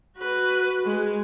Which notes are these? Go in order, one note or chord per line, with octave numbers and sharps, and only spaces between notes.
F#4 B4
G#3